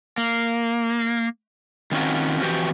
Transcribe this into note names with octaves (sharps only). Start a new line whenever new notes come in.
A#3
D#3 C4 C#4 F4 F#4
F2 E3 F#4 G4